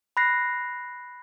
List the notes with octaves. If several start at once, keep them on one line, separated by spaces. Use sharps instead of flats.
B5 F#6 A#6 C7